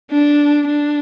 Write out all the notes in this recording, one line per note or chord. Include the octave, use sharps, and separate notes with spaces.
D4
D4